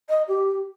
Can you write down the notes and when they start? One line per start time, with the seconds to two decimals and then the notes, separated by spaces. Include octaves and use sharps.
0.09 D#5
0.28 G4